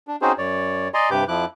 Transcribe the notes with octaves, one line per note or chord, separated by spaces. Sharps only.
D4
C4 C#4 D#4 F#4 G#4 C5
F#2 C#5 D5
D5 D#5 G#5 A#5 C6
G2 C3 G4 B4 D6 G6
F2 F3 E4 D6 F#6